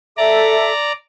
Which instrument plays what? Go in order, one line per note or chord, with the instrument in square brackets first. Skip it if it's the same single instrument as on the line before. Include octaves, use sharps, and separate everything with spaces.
[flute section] A4 E5 [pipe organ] D5 A#5